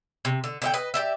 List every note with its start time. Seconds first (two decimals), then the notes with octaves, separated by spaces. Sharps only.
0.25 C3
0.44 D3
0.62 D3 D#5 G5
0.74 B4 D#5
0.94 G4 D5 E5